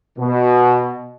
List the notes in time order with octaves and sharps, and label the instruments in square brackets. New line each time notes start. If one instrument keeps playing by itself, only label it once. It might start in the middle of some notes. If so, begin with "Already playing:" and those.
[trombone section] B2